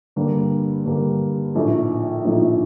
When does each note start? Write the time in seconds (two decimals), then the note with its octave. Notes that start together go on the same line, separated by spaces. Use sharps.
0.16 G2 D3 G3 A#3
0.85 G2 D3 G3 A#3
1.55 A#1 A2 F3 A3 D#4
2.25 A#1 A2 F3 A3 D#4